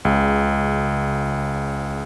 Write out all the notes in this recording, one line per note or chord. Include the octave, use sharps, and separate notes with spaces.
C#2 C#3